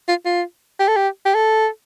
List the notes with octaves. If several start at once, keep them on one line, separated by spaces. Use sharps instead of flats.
F4
F4
G4
A4
G4
G4
A4